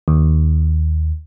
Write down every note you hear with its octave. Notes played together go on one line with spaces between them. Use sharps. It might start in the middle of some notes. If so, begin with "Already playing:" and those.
D#2